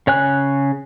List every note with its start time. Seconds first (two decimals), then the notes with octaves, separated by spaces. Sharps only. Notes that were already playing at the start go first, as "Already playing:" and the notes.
0.07 C#3 C#5 G#5 F#6